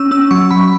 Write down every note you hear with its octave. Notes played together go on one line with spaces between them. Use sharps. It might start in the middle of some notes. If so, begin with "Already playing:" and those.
Already playing: C#4 E6
C#4 E6
F#3 C#6
F#3 B5